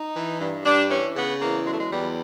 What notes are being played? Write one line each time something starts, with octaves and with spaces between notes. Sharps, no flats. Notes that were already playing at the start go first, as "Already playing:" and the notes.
Already playing: D#4
E3
G2
G2 D4
E3 C#4
C#3 B3
E2 A#3
F#3 G#3
A3
G#3
E2 G3